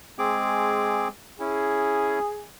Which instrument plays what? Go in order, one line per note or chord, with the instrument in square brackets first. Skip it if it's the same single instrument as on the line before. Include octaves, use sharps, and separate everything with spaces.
[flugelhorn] G#3 [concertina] C4 G#4 D6
[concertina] C#4 E4 [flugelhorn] G#4